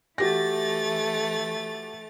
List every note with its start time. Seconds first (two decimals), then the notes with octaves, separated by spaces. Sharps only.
0.18 E3 A3 F#4 G4 A6 A#6